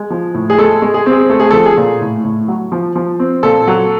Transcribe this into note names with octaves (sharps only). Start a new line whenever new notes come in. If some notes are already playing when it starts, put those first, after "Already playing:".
Already playing: G#3
F3
A2
G#4
G#3 A4
G#3
G#4
C4
G#4
A3 A4
G#4
F3 A4
G#4
A#2
A2
A2
F#3
F3
F3
C4
A#2 A4
F#3